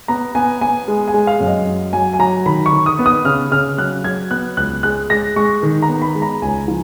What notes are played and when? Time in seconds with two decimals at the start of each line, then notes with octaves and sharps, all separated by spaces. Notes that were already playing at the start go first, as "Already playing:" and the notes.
0.08 B3 A#5
0.35 B3 G#5
0.61 B3 G#5
0.88 G#3
1.08 G#5
1.14 G#3
1.27 F5
1.40 F#2
1.47 D#5
1.67 F#3
1.93 F#3 G#5
2.13 G#5
2.19 F#3 A#5
2.46 D#3 B5
2.66 C#6
2.72 D#3
2.86 D#6
2.99 B3
3.06 D#6
3.25 C#3 F6
3.51 C#3 F6
3.78 F#3 F#6
4.04 F#3 G#6
4.31 B3 F#6
4.57 C#2 F#6
4.83 G#3 F#6
5.10 G#3 A#6
5.36 G#3 C#6
5.63 D#3
5.82 A#5
5.89 B3
6.02 B5
6.15 G#3
6.22 A#5
6.42 C#2 G#5
6.68 F3